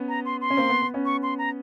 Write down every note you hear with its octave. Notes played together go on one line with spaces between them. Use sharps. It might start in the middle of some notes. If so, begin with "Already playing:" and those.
Already playing: B3 C#4
A#5
C6
C6
C#4
A#3 C4
B3
B3
B3 C#4
C#6
C6
A#5